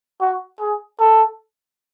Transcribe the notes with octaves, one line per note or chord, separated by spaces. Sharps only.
F#4
G#4
A4